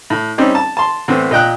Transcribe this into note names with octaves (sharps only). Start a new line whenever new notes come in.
A2
G3 C4 C#4 D#4
A5
A5 C6
A2 D3 E3 B3 C4
A#2 D#5 G5 F#6